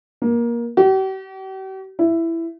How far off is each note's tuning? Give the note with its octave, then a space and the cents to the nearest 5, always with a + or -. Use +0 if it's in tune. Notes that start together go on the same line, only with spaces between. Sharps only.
A#3 +20
G4 -45
E4 +10